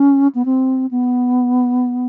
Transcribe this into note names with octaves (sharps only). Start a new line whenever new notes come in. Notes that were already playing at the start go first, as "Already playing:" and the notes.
Already playing: C#4
B3
C4
B3